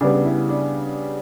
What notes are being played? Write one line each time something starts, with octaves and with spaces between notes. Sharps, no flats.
C#3 G3 B3 D4
E4
D4